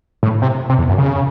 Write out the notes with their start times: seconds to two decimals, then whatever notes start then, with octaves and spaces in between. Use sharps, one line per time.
0.23 A2
0.42 C3
0.69 C3
0.79 E2
0.89 F#2
0.98 C#3